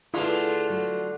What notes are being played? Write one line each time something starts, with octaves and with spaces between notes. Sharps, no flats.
D3 A3 E4 F4 G#4 B4
F#3